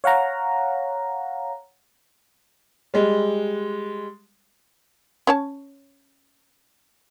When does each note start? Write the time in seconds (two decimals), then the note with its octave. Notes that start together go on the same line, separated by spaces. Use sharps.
0.04 C#5 F5 F#5 A#5
2.94 G3 G#3
5.27 C#4 C#5 A5